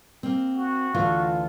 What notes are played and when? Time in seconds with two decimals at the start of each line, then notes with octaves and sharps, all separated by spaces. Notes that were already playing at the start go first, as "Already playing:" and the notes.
0.23 A#3 C4
0.55 F#4
0.94 D2 E3 F4 A4